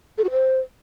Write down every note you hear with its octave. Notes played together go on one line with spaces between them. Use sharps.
A4
F#4
C5